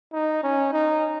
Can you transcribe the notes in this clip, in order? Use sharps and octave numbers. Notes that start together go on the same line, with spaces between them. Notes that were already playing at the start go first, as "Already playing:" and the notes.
D#4
C#4
D#4